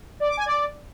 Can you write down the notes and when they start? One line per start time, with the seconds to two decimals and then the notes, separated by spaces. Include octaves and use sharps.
0.20 D5
0.29 D6
0.37 G#5
0.46 D5